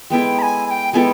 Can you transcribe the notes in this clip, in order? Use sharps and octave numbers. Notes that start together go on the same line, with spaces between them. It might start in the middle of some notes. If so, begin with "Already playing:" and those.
G#3 B3 E4 A4 G5
B5
G#5
G#5
G5
G#3 B3 E4 A4 G5 G#5